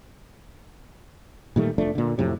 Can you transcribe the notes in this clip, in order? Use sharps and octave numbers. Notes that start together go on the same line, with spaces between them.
A#2 D#3 G3 A3
F1 F3 A3 D4
A#2 D3
F2 A2 C3 F#3